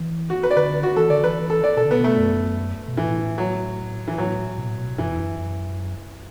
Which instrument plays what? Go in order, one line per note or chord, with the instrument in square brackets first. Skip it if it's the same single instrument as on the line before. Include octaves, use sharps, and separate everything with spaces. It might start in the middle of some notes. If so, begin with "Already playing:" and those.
Already playing: [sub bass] E3
[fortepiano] F#4
B4
D5
[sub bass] D3 [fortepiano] B4
[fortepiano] F#4
[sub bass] E3 [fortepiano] A4
[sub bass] D3 [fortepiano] D5
[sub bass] E3 [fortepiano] B4
[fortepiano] A4
D5
[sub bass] B2 [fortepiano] A4
[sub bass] D3
[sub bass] B2 [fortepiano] B3
[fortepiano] A3
[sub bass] F#2
B2
[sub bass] A2 [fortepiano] E3
[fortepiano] F#3
E3
[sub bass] A2 [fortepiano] F#3
[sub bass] B2
A2
B2
[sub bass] F#2 [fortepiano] E3
[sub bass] E2
F#2
F#2